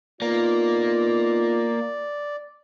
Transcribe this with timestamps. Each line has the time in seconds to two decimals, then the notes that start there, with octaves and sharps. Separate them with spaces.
0.22 A#3 B3 D#4 F4 D5